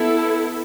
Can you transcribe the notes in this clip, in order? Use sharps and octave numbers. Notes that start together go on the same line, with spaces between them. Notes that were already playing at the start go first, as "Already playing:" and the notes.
Already playing: B3 E4 A4